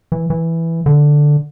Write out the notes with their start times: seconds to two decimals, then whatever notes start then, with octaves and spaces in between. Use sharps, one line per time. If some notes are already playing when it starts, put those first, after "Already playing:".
0.12 E3
0.30 E3
0.86 D3